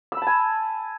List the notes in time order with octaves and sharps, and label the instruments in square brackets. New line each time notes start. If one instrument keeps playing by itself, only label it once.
[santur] E6
B5
A5
G#5